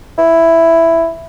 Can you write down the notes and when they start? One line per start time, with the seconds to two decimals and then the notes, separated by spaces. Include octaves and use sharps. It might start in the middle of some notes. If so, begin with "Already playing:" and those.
0.18 E4